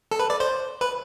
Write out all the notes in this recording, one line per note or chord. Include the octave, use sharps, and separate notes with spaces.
A4
B4
D5
C5
B4